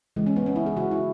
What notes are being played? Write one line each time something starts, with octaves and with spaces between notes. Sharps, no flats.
C#3 E3 G#3
C#4
B3
C#4
E4
G#4
C#3 F#3 F#4
E4